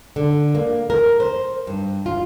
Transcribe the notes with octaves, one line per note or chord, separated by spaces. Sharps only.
D3
A#3
A#4
C5
G2
F4